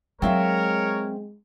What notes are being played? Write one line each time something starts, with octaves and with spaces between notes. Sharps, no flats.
F#3 G#3 C4 A#4 C#5 E5 F5